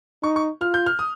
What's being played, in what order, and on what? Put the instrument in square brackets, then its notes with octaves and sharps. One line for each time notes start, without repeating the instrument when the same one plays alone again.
[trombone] D#4 [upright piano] C#6
[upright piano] C#6
[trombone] F4 [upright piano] F6
[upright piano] G6
F6
D#6